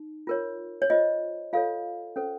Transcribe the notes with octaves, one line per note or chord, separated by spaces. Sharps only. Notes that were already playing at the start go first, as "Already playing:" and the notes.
Already playing: D#4
F4 A#4 C#5
C#5
F4 C5 D#5
F4 A4 C#5 F5
C#4 A4 C5